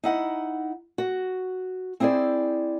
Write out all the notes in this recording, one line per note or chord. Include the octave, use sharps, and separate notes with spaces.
D#4 E4 F#5
F#4
C4 E4 G#4 C5 D5